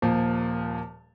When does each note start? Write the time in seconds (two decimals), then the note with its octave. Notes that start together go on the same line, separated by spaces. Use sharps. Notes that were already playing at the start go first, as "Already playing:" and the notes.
0.02 D#1 A#2 F3 A#3